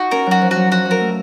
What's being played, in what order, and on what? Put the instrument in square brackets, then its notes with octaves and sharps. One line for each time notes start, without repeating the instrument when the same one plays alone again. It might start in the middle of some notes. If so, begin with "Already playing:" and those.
Already playing: [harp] D#4 F4 [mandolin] F#4
[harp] C#4 [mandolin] A#4
[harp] F#3 [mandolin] F#4
[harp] F3
[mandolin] F#4
[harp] F#3
[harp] F3 [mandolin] F#4
[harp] F#3
[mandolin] A#4
[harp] A3